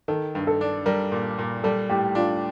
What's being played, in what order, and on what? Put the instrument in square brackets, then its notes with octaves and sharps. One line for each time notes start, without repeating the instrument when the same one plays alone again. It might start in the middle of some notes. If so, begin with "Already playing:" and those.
[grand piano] D#3 [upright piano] A4
[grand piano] G2
[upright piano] A4
[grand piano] D4
[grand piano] G3 [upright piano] A#4
[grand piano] A#2
A#2
[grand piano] G3 [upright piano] A4
[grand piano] A2 [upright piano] G4
[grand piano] D4 [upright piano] F4